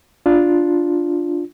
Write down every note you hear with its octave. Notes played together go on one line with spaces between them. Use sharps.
D4 F4